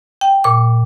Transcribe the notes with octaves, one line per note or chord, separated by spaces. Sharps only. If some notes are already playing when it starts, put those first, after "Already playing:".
G5
A#2 D6